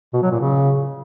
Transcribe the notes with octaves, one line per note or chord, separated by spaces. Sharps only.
B2
F#3
A#2
C#3